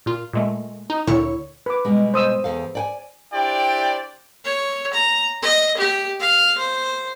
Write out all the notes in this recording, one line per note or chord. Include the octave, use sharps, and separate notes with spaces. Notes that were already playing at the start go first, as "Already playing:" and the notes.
A#2 F4
A#2 G#3 A3
D#4
D2 A#2 D3 E4 C#5 C#6
B4 D6
B2 G3 G#3
C5 D#6 E6
E2 A4 F5
D5 G5 G#5
D4 E4 G4 C5 D5 G5
C#5
A#5
D#5
G4
F5
C5